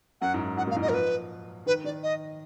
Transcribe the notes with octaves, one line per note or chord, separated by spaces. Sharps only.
F#2 F#5
G#2
F#2
G#2 F#5
A#2 F5
G#2
D#5
F3 A#4
B4
D#3 B4
D#3 D5
D#5